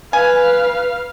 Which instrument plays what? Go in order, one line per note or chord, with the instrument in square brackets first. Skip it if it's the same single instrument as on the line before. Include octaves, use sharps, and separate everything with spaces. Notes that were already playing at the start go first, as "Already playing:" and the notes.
[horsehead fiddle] B4 [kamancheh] F5 [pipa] G#5